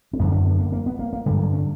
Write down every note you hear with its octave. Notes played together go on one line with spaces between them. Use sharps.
C#4
F#2 D3 B3
C#4
B3
A#3
A#3
B3
A#3
A#3
G2 D3 G3
F#3
C#4